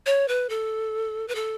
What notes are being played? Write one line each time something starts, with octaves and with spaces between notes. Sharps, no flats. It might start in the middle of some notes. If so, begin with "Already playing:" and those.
C#5
B4
A4
B4
A4